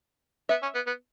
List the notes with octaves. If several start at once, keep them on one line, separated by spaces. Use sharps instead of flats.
B3 E5
C#4
B3
B3